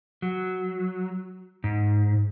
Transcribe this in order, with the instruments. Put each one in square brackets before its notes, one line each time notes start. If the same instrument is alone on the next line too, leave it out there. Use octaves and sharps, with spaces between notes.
[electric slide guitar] F#3
G#2